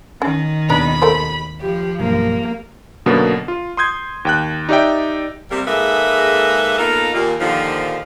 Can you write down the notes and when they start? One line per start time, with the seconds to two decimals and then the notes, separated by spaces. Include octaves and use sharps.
0.22 D#3 C#4
0.70 D#2 B2 B3 D4 A#5 B5
1.02 A3 A#4 C5
1.61 F3 G4
2.00 B1 G2 A#3
3.06 F#2 B2 D3 A#3 B3
3.48 F4
3.77 C6 D#6 G6 G#6
4.25 D#2 G5 F#6
4.69 D#4 G4 D5 E5 G5
5.51 C3 G3 A#3
5.67 G#2 G#3 A#3 A4 B4 E5
6.78 A#3 B3 D#4 F4 A4 A#4
7.14 D#2 A#2 A#3
7.41 D#2 A#2 D3 D#3 F3